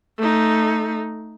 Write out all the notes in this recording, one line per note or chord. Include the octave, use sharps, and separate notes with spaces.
A3 D#4